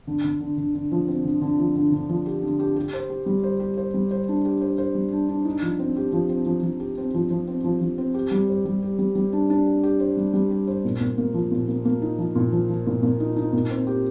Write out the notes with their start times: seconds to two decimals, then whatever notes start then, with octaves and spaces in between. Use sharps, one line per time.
0.07 D3
0.24 D3
0.41 D3
0.57 D3
0.75 D3
0.91 F3
1.08 C4
1.25 D3
1.42 D3
1.59 F3
1.76 D3
1.92 D3
2.09 F3
2.26 G4
2.42 D3
2.59 G4
2.76 G4
2.93 C5
3.10 G4
3.26 G3
3.44 C5
3.60 G4
3.77 C5
3.94 G3
4.11 C5
4.28 D4
4.45 G4
4.61 C5
4.78 C5
4.95 G3
5.12 D4
5.29 D4
5.45 D#4
5.62 F3
5.79 C4
5.97 G4
6.13 F3
6.29 C4
6.46 F3
6.63 F3
6.80 G4
6.97 C4
7.14 F3
7.31 F3
7.47 C4
7.64 F3
7.81 F3
7.98 C4
8.14 G4
8.31 G3
8.49 C5
8.65 G3
8.82 G4
8.99 G3
9.15 G3
9.33 D4
9.50 D4
9.66 G4
9.83 G4
10.00 C5
10.17 G3
10.33 G3
10.51 G4
10.67 C5
10.84 A#2
11.00 A#2
11.18 A#3
11.34 F3
11.51 A#2
11.68 A#3
11.85 A#3
12.02 D#4
12.18 F3
12.35 A#2
12.52 F3
12.69 F3
12.86 A#2
13.02 A#2
13.20 D#4
13.36 D#4
13.53 A#2
13.70 C4
13.87 G4